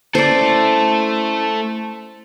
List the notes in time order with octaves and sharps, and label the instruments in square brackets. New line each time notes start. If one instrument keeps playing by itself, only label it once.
[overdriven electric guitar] A3 A4 [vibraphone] C#4 E4 C6 [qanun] C5 D5